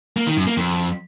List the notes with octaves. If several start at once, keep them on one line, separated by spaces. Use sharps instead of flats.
A#3
D#3
F#2
A#3
F2